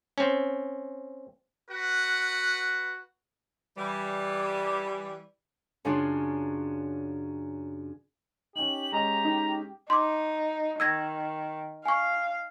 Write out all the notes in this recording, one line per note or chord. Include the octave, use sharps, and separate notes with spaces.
C4 C#4
F#4 B4 F#5
E3 G3
F#2 C#3 D4 F4
C#4 D#4 G4 F#7
G#3 C#4 D#5 A#5
D#4
D#4 C6 D6
D#3 E6 G#6 A#6
F5 G#5 C#6